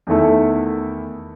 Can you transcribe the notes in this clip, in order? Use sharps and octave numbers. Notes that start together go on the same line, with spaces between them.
E2 D#3 A3 E4 A4